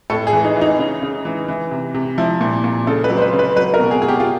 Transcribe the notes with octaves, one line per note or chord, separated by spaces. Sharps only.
A2 A4
G#4
E3
D#4
E3
D#4
C#3
C#3
E3
E3
C3
C3
F3 E4
A#2
A#2
C#3 A4
B4
F#3
C5
B4
C#3
B4
F#3 B4
A#4
B2
G#4
B2 G#4
G4
F4